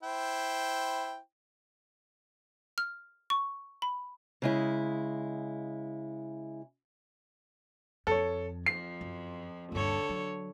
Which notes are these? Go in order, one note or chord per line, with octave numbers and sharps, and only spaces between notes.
E4 C5 G5
F6
C#6
B5
C#3 G#3 E4
F2 A4 C#5
F2 F3 C7
F#2
D#1 G2 D3 A4 C#5
F#3